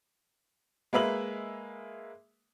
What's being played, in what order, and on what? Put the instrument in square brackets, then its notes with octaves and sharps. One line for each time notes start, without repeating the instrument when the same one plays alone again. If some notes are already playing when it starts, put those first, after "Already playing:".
[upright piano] G#3 A#3 B4 E5 F#7